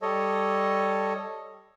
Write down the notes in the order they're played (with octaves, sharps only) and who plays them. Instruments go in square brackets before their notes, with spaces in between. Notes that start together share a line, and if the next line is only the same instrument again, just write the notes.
[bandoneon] G3 A4 C#5 D#5